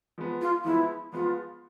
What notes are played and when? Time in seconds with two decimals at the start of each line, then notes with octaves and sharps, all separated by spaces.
0.18 F3 G#3 B3
0.41 F4
0.65 F3 G#3 B3 E4
1.13 F3 G#3 B3 F4